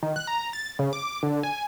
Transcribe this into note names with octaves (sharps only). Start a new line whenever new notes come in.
D#3
F#6
A#5
A6
C#3
D6
D3
G#5